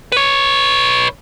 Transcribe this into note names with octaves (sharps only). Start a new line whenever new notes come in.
B4 C#5